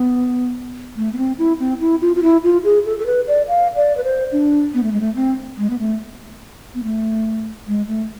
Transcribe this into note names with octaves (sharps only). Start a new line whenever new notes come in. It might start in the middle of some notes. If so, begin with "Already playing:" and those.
Already playing: B3
A3
B3
C4
E4
C4
E4
F4
F4
E4
F4
G#4
A4
A4
B4
D5
F5
D5
B4
C5
D4
B3
A3
G#3
A3
C4
G#3
B3
A3
B3
A3
G#3
A3